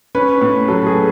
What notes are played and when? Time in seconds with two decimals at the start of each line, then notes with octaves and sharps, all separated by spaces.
0.15 C#4 B4
0.41 A2
0.68 F#3 A4
0.86 G#4
0.95 A3